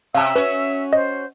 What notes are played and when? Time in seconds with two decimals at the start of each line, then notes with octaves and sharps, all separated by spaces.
0.15 C3 E5 F5 A5 E6
0.36 C#4 F#4 B4
0.93 C5 D#5